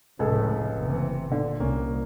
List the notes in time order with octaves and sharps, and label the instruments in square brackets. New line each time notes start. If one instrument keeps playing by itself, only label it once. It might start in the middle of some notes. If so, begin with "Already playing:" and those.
[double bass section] F1 A2 [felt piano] C#2 G#4 A4
[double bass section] F#1 C3 E3
[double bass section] A#2 [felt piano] D3
[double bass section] C2 [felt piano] A#3 C#4